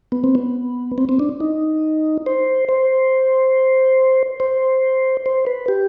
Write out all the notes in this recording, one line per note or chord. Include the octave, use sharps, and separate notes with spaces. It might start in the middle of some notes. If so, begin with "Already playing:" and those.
B3
C4
B3
C4
C4
D4
D#4
C5
C5
C5
C5
B4
G4